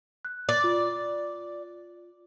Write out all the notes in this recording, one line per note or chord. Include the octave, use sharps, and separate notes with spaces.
F#6
D5
F4